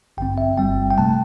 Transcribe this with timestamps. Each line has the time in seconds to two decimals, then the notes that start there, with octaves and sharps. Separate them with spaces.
0.17 A1 G2 D3 C4 G5
0.38 E5
0.58 G1 G2 G3 C4 G5
0.90 G5
0.98 C3 A3 A5